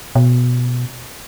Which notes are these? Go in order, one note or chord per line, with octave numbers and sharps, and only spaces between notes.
B2